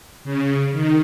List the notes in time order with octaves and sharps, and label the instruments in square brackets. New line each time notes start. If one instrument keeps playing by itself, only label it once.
[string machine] C#3
D#3